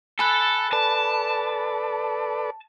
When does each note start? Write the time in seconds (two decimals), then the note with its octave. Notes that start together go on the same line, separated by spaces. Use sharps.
0.19 A4 G#5 B5 F#6
0.72 A4 B4 D5 A5